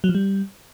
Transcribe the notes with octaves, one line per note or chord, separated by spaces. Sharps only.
F#3
F3
G3